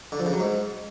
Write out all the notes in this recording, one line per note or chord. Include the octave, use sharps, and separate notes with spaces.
D3
F3
C#3
F#3
G#2